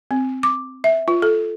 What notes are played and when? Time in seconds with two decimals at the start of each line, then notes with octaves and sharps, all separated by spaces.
0.11 C4
0.43 D6
0.84 E5
1.08 F4
1.22 A4